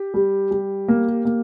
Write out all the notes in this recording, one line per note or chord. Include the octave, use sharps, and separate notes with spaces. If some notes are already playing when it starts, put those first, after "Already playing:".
Already playing: G4
G3
G3
A#3
A#3